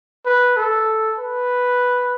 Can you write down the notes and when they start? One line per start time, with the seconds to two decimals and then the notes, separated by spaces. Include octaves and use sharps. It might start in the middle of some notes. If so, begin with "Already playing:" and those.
0.26 B4
0.57 A4
1.18 B4